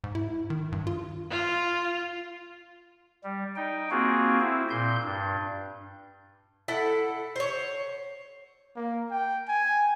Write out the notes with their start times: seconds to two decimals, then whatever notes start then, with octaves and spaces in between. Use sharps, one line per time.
0.04 G#2
0.15 E4
0.50 D#3
0.72 G2
0.87 F4
1.31 F4
3.24 G3
3.56 D#4 G5
3.91 A#3 C4 F4 F#4 G#4
4.41 C4 E4
4.70 A#2 C6 G6
5.04 G2
6.68 E4 A4 F#5
7.36 C5 C#5
8.76 A#3
9.11 G5
9.48 G#5